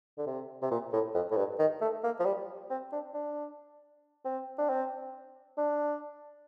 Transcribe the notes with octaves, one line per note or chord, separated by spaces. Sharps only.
D3
C3
C3
A#2
A2
F2
A2
G2
D#3
A3
A#3
F3
G3
C4
D4
D4
C4
D4
C4
D4